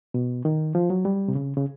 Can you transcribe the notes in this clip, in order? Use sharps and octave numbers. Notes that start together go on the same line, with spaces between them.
B2
D#3
F3
F#3
G3
C3
C#3
C#3